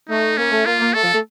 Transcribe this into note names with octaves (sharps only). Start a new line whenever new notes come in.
A3 D#4
A#3 C#4
A3
A#3 F4
A#3
A3 A4
F3
A3